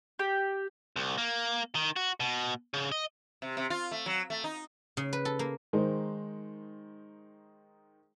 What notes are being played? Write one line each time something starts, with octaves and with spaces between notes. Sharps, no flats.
G4
C2
A#3
D#3
F#4
B2
C#3
D#5
C3
C3
F4
A3
F#3
A3
D#4
C#3
B4
A4
A#3
D#3 G#3 D#4 C5